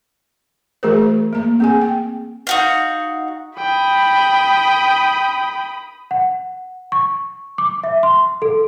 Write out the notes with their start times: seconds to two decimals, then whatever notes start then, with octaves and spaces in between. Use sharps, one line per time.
0.83 E3 A3 F#4 G#4 A#4 C5
1.33 A#3 A#5
1.60 C4 G#4 G#5
1.82 G5
2.47 D#4 F#4 F5
3.58 G5 B5 D#6
6.11 F#5
6.92 C#6
7.58 D6
7.84 E5
8.03 C6
8.42 A4